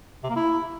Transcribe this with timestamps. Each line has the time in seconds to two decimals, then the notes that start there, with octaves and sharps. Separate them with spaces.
0.23 C3
0.30 A#3
0.36 E4